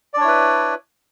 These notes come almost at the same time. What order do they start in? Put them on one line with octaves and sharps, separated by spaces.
D5 D4 C#5 E4 B4